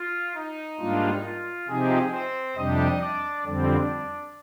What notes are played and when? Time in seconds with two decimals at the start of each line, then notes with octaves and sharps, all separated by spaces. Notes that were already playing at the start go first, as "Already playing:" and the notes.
Already playing: F4
0.34 D#4
0.79 G#2 G3 A#3 D4 F4
1.23 F4
1.68 C3 F3 G#3 C4 D#4 G4 G#4
2.12 C4 C5
2.56 F2 C3 G3 D4 D#4 G4 D#5
3.01 D4 D5
3.45 F2 D3 G3 C4 D4 D5